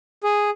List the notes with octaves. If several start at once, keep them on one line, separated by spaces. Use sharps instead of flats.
G#4